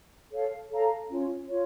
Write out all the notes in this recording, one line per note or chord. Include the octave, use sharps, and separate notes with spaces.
A4 C#5 F5
A4 C#5 F5 A#5
C#4 F4 C#5
F4 C#5